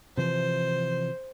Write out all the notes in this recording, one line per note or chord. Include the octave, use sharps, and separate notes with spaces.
C3 E3 F3 C5